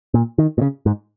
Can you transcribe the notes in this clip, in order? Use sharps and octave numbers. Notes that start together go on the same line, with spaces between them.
A#2
D#3
A#2
C#3
G#2